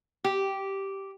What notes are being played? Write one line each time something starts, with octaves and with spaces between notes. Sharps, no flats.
G4